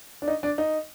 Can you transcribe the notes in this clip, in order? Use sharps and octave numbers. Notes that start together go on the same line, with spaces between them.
D4
D#4
D4
D#4